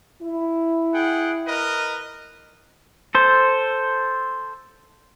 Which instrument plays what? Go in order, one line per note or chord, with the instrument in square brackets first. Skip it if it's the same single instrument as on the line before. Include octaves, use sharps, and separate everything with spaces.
[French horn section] E4
[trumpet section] G#4 F#5 G5
A#4 B4 D#5
[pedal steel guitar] A4 C5